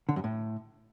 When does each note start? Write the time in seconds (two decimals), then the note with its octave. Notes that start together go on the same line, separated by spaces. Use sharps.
0.09 D3
0.16 F#2
0.24 A2